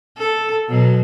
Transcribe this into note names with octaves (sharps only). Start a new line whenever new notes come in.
A4
B2 F#3